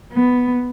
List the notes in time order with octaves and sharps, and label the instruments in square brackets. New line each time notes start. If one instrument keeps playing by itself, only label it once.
[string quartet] B3